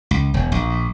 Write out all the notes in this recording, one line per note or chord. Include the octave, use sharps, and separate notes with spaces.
C#2
E1
A#1